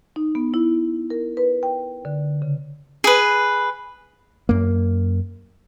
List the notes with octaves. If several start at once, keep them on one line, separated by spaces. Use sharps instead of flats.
D#4
B3
E4
A#4
B4
G5
D3
C#3
G#4 B4
F#2 A#3